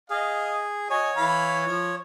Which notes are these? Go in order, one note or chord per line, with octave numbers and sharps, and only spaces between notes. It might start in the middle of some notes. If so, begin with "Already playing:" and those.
G#4 D#5 F5
F#4 C#5 D#5 G#5
E3 F5 B5
F3